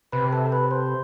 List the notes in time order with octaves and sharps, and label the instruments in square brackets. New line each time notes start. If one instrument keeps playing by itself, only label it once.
[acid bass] C3 [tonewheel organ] B4
[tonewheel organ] A4
B4
C5